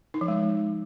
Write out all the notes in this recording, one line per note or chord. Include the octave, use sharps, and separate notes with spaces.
D#4
F3
G#3